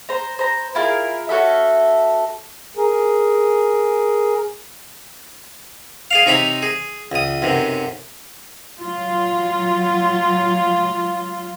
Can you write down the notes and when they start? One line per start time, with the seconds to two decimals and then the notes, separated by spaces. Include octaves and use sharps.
0.09 C5 A#5
0.39 C5 A#5
0.75 E4 F4 G#4 A#4
1.29 C#4 F#4 A4 E5
2.77 G#4 A#4
6.11 G#4 D5 F5
6.26 C3 D#4 C#5 A#5 B5
6.62 G#4
7.12 C#2 D#6
7.42 B1 F#2 C3
8.80 F#3 F4